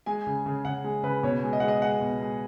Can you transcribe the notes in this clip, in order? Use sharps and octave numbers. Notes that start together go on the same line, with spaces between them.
G#3 G#5
C#3
C#3
C#3 F#5
G#3
C#3 B4
B2 C#5
G#3
D#5
G#3 F#5
D#5
G#3 F#5
B2
G#3